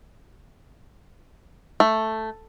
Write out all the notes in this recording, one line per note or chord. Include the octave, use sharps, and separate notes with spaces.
A3